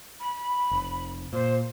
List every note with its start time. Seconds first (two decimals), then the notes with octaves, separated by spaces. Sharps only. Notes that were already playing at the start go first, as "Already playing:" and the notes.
0.20 B5
0.71 F1
1.33 A#2 C5